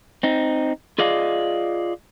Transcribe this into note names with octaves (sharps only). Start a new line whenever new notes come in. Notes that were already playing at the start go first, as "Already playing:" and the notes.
C4 D#4
F4 G#4 D5 D#5 F5